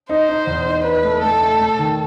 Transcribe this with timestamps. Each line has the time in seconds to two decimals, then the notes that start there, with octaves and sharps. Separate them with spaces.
0.09 D#4 C5
0.29 D#4
0.47 E2
0.66 D#4
0.84 D#4 B4
1.03 A3
1.22 A3 A4
1.41 A3
1.60 A3
1.79 D#3